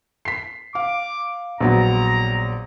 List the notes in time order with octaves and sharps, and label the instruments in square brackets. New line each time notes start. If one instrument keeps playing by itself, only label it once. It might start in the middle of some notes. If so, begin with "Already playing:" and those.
[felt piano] B6 C7
[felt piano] F5 [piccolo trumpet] D6
[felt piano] A#1 F#3 B3 [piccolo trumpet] A#5